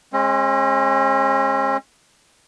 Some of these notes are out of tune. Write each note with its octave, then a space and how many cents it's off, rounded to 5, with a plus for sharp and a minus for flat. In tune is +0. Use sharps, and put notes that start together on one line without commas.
G#3 +5 C#4 -40